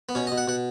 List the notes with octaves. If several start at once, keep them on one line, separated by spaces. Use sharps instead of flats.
B3
B2 C#4
D#5
B2
F#5
B2 F#5